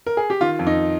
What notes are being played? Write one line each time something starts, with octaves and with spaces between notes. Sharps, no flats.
A#4
G#4
G4
D#3 F4
F2
D#4